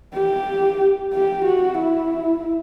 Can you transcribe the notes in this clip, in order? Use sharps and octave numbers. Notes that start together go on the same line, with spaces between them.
G4
G4
F#4
E4